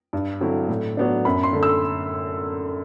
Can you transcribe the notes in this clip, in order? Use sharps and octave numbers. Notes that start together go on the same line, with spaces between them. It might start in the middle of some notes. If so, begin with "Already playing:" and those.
G2
D3 F#3 C4 E4
A2
F#3 B3 D4
F#2 B5
C6
D3 A3
E6